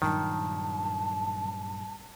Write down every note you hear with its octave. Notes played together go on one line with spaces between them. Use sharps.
G2 A#2 D#3 F#3 A5